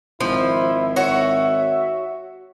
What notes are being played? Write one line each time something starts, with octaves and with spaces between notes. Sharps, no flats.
G#1 F3 E4
F#4 C#5 E5